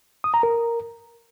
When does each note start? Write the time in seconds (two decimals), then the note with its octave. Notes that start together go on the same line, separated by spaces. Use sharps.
0.24 D#6
0.34 A#5
0.43 A#4